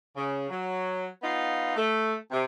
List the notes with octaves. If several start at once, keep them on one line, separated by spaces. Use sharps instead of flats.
C#3
F#3
B3 D#4 F4
A3
C3